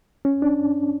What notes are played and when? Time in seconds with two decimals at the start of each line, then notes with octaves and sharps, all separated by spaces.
0.25 C#4
0.42 D4